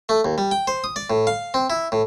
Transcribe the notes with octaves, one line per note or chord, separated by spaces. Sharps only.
A3
D#2
G3
G5
C5
D#6
D5
A2
F5
C4
E4
A2